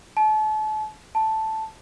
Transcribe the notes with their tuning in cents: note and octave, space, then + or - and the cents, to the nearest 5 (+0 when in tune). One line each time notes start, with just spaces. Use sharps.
A5 -35
A5 +0